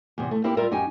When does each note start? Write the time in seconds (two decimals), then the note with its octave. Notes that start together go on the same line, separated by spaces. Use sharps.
0.18 E2 C3
0.31 A3
0.44 A#3 C4 E4 G4
0.57 G3 F4 A#4 E5
0.71 F#2 D#4 G4 G#5